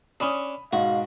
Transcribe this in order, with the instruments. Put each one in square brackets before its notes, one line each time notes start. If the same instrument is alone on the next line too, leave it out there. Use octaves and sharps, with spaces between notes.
[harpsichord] C#4 D4 [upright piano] B5 D#6
[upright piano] G#2 B2 [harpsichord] F#4 [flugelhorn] F5